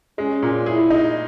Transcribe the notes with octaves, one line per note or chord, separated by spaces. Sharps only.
G#3 C#4
A#2
E4 G#4
D#4